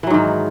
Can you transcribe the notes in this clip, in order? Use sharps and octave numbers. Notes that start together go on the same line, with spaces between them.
G#2 D#3 E3 F#3